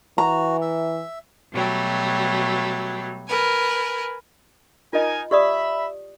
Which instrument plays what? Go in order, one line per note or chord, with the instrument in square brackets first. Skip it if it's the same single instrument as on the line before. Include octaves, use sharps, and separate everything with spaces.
[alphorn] E3 [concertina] F#4 [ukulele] A#5
[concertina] E5
[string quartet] B2 F#3 G3 A3
A#4 B4 G#5
[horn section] D#4 A#4 G#5 [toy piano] F4 D#5
[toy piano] G4 D5 D#6 [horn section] E5 B5